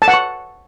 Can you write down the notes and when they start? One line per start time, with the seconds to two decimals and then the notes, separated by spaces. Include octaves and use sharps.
0.02 A5
0.08 F#5
0.14 C#6